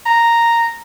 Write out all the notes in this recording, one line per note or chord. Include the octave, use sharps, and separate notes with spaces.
A#5